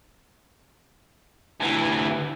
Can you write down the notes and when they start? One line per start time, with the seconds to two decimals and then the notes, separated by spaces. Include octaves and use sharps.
1.60 D2 E3